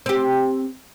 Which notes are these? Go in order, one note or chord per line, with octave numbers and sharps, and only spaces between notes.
C4 G4